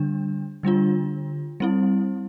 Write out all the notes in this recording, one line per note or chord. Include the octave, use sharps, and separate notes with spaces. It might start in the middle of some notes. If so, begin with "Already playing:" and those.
Already playing: D3 G3 D4
D3 G3 D4 F4
G3 C4 E4